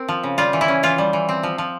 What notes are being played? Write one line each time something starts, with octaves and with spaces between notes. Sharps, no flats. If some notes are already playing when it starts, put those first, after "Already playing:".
Already playing: C4 A#4
F3
C#3
G3 F4
E3
E4
C#4
E3 F4
G3
E3
C4
F3
F3